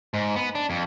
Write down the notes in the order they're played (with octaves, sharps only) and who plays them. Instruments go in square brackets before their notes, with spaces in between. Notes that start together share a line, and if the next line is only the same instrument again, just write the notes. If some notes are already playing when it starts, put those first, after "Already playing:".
[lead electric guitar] G#2
B3
D4
F2